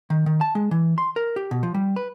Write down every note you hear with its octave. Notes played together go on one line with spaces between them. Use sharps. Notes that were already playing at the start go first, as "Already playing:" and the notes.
D#3
D#3
A5
G#3
E3
C6
A#4
G4
B2
F3
G3
B4